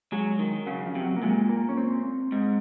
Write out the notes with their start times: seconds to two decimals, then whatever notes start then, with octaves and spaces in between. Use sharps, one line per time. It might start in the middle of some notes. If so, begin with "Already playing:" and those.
0.12 F#3 G#3
0.39 D#3
0.67 C#3 F#3
0.86 F3
0.95 C3
1.04 F#3
1.16 A#3
1.23 A#2 G#3
1.49 A#3
1.69 C#4
1.77 C4
2.32 G#2